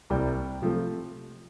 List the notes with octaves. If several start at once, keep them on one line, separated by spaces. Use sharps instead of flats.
C2 C3 G3 G5
C3 F3 A3